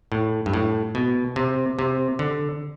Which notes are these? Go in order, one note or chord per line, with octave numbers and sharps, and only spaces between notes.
A2
G2
A2
B2
C3
C3
D3